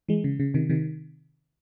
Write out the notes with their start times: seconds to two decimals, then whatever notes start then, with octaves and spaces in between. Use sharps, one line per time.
0.08 E3 G#3
0.24 C#3
0.40 C#3
0.54 C3 D#3
0.69 C3 D#3